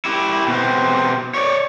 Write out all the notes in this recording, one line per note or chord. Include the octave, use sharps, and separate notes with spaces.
E4 G4
B2 C4
C#5 D5